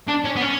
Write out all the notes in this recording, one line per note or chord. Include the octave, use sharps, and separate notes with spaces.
D4
C#4
B3
C#4